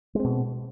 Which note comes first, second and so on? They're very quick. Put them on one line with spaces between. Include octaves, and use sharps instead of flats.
G#3 C4 B2